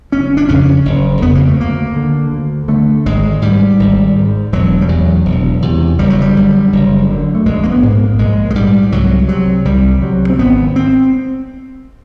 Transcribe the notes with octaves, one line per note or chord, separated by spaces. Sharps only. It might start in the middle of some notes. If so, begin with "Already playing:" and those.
F#1 C#4
D4
F2 C#3 C#4
F#1
F2 C#3 B3
A#3
A3
D2 A#3
D3
D2
D3 A3
G#1 G#3
G#2 G3
G#1
G#2
E1 F#3
G3
E2 C3 F#3
E1
E2 C3
F#1 G3
F#3
G3
F#2 D3
F#1
F#2 D3
A3
A#1 G#3
A#3
B3
G#2
A#3
A#1 G#3
G#3
G#2 G3
C2 F#3
C3 F#3
C2 G3
C3 F#3
C4
G#1 B3
C4